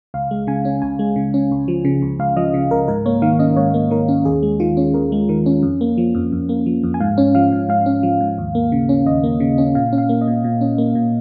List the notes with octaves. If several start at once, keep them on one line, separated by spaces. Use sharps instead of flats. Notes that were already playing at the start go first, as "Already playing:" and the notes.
C#2 F5
G#3
C#3 G#5
C#4
C#2 G#5
G#3
C#3
C#4
C#2
F3
C#3
C#2
C#2 F5
F3 D#5
C#3
C#2 A#4
G#2 A#4
A#3 C#5
D#3 F5
C#4 D#5
G#2 C#5
A#3
D#3 A#4
C#4
D#2 G#4
G#3
D#3 F4
C#4
D#2 A#4
G#3
D#3 A#4
C#4
F2
A#3
F3
F2
F2
A#3
F3
F2
G#5
G#2 F5
C#4
F3 F5
G#2
G#2 F5
C#4
F3
G#2
D#2
A#3
C#3
C#4
D#2 D#5
A#3
C#3
C#4
A#2 F5
C#4
F5
A#3
D#5
A#2
A#2
C#4
A#3
A#2